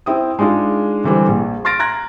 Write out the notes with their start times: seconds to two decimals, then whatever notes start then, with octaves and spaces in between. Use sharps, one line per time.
0.06 C4 E4 G5 D#6
0.39 G#3 D4 D#4 F4 G#4
1.04 D3 E3 G3 C4
1.28 A#1
1.65 C6 F6 A6 A#6 D7
1.79 A#5 F#6 G#6 A#6